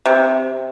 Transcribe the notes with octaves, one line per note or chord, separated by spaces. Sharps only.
C3